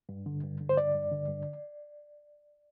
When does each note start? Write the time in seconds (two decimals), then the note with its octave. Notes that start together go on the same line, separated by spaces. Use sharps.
0.09 G2
0.26 D3
0.43 G2
0.61 D3
0.69 C5
0.77 G2 D5
0.94 G2
1.11 D3
1.28 G2